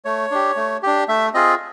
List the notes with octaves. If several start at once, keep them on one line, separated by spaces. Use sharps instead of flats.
A3 C#5
D4 G4
A3
D4 G4
A3 E5
C4 F4 G#4 D#5